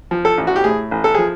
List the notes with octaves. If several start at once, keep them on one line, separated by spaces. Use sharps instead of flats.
F3
A4
A1
F#4
G4
A2 G#4
A1
A4
F3 G#4